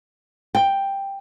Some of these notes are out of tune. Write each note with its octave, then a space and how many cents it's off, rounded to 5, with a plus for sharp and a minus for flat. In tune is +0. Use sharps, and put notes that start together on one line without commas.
G5 +5